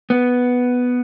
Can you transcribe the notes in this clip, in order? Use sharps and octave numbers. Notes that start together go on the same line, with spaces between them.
B3